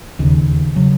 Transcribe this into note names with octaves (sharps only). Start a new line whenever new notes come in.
E1 D#2 C#3
C#3 F#3